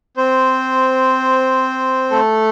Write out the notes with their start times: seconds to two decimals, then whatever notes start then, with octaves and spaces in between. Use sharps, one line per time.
0.17 C4 C5
2.11 A3 A4